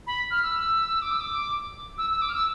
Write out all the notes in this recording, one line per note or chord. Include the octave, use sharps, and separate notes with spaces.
B5
F6
E6
D6
E6
D6
E6
E6
D6
F6
E6